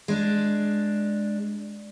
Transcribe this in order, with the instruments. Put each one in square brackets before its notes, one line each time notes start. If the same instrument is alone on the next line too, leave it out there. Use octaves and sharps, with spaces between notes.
[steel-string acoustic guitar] G#3 D4